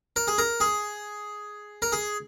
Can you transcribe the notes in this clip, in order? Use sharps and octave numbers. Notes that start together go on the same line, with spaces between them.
A#4
G#4
A#4
G#4
A#4
G#4